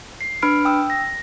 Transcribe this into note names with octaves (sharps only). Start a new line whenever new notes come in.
C7
D4 B4 B5 F6 D7
G5 D#6 E6
A#6